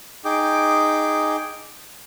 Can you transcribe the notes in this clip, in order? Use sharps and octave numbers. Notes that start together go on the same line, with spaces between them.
D#4 G#4 G5 D6